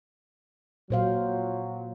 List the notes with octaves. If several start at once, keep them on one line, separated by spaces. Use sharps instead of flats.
A#2 F#3 C5 F5